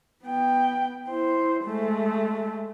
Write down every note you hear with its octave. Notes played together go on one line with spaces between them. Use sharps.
B3 G5
E4 C5
G#3 A3